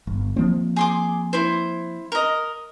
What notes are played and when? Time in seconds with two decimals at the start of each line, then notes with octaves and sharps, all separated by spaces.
0.07 G1
0.36 F3 A#3 C4
0.76 G#4 C6 D6
1.33 E4 C5
2.12 A#4 D#5